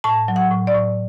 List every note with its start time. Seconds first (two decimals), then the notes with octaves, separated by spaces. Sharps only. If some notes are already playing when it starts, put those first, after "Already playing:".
0.04 A2 A5
0.28 F#3
0.36 F#5
0.51 A2
0.67 D5
0.75 A2